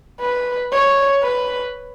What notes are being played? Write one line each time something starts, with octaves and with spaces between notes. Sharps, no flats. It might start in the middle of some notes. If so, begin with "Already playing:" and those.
B4
C#5
B4